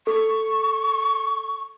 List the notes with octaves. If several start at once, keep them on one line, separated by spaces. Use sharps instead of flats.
A4 C#6